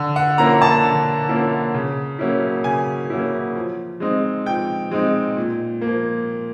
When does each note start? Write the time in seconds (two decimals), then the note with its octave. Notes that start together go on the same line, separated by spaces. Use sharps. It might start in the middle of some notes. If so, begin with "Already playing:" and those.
Already playing: D3
0.16 F#5
0.38 F3 A#3 C#4 E4 A#5
0.62 A5
0.84 D3
1.29 F3 A#3 C#4 E4
1.74 C#3
2.19 F#3 A#3 C#4 E4
2.64 C#3 G#5
3.10 F#3 A#3 C#4 E4
3.55 F3
4.00 G#3 C4 D#4
4.46 F3 G5
4.91 G#3 C4 D#4
5.37 A#2
5.81 A#3
5.87 F3